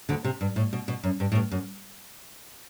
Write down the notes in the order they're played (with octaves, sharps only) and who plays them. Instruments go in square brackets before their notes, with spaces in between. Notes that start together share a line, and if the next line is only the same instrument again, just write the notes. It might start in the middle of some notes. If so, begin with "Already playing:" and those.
[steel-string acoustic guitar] D2 D3
C3
G2
A2
B2
B2
F#2
G2
A2
G2
F#2